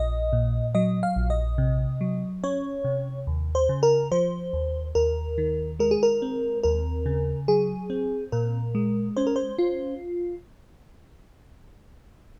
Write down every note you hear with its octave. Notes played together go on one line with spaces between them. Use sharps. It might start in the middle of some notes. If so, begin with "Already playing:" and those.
Already playing: A#1 D#5
A#2
F#3 D#5
F5
A#1
D#5
C3
F#3
C#4 C#5
C3
D#2
C5
C#3
A#4
F3 C5
D#2
D#2 A#4
D#3
G#3 A#4
G#4
A#4
C4
D#2 A#4
C#3
F#3 G#4
C4
A#2 A#4
G#3
C#4 C5
A#4
C5
F4